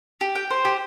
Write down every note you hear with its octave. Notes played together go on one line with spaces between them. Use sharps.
G4
G5
C5
G4